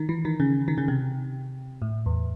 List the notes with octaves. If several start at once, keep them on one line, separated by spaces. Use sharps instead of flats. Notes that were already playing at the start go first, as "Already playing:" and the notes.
Already playing: D#3
E3
D#3
C#3
D#3
C#3
C3
A2
E2